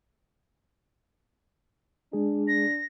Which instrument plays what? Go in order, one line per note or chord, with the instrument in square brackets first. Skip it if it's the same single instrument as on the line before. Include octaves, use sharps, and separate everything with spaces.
[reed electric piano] G#3 G#4 [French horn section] D4
[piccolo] A#6